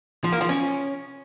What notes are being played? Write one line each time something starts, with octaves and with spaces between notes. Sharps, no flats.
F3
A#3
F3
C#4